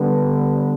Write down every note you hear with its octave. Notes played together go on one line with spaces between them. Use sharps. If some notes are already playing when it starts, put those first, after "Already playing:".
Already playing: D3 G3 B3